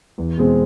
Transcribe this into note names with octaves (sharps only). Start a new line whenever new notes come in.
E2
B2 G#3 C4 G#4